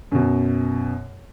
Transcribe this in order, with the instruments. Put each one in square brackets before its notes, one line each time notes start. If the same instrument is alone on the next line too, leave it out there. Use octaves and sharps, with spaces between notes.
[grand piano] F#2 B2